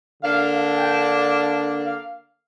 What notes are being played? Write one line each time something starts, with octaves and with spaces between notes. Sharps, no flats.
D3 A#3 D4 F5
G5
F5
F5